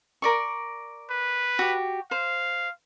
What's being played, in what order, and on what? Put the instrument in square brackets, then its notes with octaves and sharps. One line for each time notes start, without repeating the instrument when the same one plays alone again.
[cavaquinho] A#4 D5 C#6
[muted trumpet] B4
[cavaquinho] F#4 G4
[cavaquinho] C5 [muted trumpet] F5